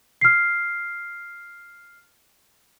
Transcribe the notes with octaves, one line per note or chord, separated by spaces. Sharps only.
F6 C7